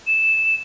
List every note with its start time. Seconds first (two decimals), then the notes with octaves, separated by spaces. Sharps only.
0.07 E7